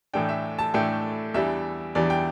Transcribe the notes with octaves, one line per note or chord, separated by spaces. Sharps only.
A2 E3 A3 D4 G5
E5
A5
A2 E3 A3 D4 G5
E2 E3 G3 D4 E5
E2 E3 G3 D4 D5
G5